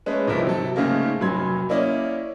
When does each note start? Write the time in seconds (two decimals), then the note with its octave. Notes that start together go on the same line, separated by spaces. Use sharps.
0.06 G#3 A3 C#4 B4
0.27 G1 C2 G#2 F3 A#4 E5
0.45 C3 F#3 A4
0.76 G#2 C#3 A3 A#3
1.21 F1 F#2 F#3 B5 C6 G#6
1.69 A#3 C#4 E4 D5 D#5